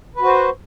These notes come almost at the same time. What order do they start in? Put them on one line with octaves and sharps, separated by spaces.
B4 F#4 C5